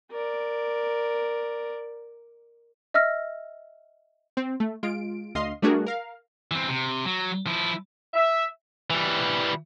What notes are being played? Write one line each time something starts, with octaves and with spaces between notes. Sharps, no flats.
A#4 D5
D#5 E5 E6 F6 A#6
C4
A3
G#3 F4 D7
D2 D#5 F5 C6
G3 A3 D4 F#4 G#4 A#4
A#4 F5
E3 C4
C3
F#3
F3 E4
E5
E3 G3